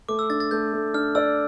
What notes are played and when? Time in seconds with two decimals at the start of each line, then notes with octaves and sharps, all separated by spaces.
0.09 A3 D6
0.19 E6
0.30 D4 A6
0.40 A6
0.51 A3 G6
0.73 A3
0.94 D4 F6
1.15 D5 E6